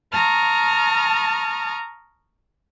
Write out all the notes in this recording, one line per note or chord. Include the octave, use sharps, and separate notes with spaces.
A5 A#5 C#6 D#6 F6